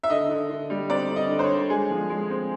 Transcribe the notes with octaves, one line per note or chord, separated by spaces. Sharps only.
E5
D3 D#5
D3
D3
G3
C4 D5
D3
D#5
D3
C5
C#5
D3
G#3 G#4
F3
G#3
C4